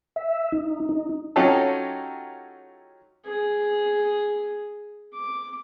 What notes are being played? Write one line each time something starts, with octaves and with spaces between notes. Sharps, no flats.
E5
D#4
D#4
F#3 C#4 D#4 F4 G4 A4
G#4
D6